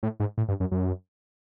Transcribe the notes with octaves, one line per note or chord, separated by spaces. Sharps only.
A2
G#2
A2
G2
F#2
F#2